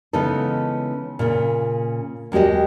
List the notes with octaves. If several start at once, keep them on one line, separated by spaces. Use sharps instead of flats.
C#3 E3 G#3 B3 D#4 A4
A#2 C#3
D#2 G#3 F#4 G4 D#5